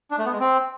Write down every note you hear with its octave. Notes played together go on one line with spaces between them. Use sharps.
D4
A3
B3
G#3
C4